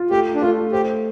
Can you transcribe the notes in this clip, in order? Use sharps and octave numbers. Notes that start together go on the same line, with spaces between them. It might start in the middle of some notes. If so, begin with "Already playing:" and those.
Already playing: F4
A3 G4
D4
A3 F4
G4 C5